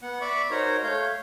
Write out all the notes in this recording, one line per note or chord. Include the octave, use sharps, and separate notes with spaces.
B3 F#5
D5 E5 B5 C#6 D6
D#4 F#4 A#4 C5 C#5 A#5
A3 C#5 F5 G6